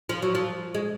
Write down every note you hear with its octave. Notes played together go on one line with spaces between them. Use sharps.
F3
F#3
F3
G#3